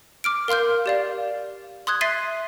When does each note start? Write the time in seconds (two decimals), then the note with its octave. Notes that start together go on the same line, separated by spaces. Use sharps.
0.24 D6 F6 D7
0.48 A#4 F5 C6 F6 G6
0.86 G4 D5 F5
1.87 C6 D#6 F#6 G#6
2.01 E5 C6 A6 B6 C7 D#7